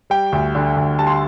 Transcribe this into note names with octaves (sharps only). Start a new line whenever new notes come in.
G3 G5
D2
D3
D2
G3 A5
C6